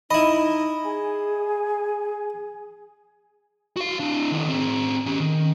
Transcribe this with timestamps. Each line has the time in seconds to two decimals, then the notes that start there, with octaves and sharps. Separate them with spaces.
0.11 D#4 E4 D#5 B5
0.84 G#4 G#5
3.77 F#4 F5
4.00 D4 E4
4.31 D#3 D4
4.49 C4 G#4
5.06 C#4 G4
5.20 D#3